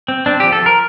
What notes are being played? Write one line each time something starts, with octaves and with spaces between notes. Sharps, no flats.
C4
C4 D4
F3 G4
A4
F3 A#4